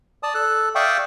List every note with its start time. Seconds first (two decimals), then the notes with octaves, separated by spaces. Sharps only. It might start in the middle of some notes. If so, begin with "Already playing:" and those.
0.23 D5 A5 D#6
0.34 A4 F#6
0.75 D5 E5 F5 G5 C#6 D#6